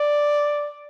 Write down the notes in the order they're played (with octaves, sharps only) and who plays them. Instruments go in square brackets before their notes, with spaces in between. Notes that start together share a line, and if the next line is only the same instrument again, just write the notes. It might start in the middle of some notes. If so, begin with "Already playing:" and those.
Already playing: [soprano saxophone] D5